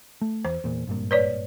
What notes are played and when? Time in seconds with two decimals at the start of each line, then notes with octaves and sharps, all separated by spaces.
0.21 A3
0.45 E2 C5
0.64 E2 A#2
0.87 G#1 G2 A#2
1.11 B4 C#5 D5